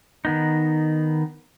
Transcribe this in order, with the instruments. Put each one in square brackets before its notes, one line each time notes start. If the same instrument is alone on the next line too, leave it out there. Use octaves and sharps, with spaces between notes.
[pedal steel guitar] D#3 B3 D#4